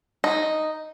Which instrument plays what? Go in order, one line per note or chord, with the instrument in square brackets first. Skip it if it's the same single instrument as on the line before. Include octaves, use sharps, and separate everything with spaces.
[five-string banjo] D#4